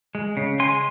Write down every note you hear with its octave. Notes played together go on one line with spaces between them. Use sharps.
G#3
C#3
G#3 G#5 C6